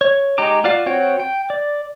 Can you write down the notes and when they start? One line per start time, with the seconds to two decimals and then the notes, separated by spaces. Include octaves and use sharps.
0.01 C#5
0.38 G#3 D#4 G4 A#5 D6
0.64 F4 F#4 D5 F5
0.86 C4 F#4 C#5 F#5 G5
1.20 G5
1.50 D5